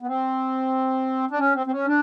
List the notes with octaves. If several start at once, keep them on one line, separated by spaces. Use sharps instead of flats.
B3
C4
D4
C#4
C4
C4
C#4
D4